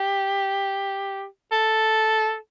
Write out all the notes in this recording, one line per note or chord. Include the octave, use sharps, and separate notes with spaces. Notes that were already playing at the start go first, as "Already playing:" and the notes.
Already playing: G4
A4